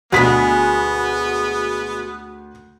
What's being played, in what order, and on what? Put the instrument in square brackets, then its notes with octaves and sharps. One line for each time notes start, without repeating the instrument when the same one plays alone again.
[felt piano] D2 B6 [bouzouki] B2 G#3 G#4 [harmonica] B3